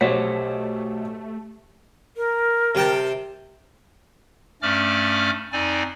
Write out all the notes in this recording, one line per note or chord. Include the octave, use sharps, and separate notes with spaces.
B1 A3 G4 C5 C#5 F#5 B6
A#4
C3 G5 A5
G2 A3 C#4 D5 D6 F6
F2 C4 D#4 D5 G#5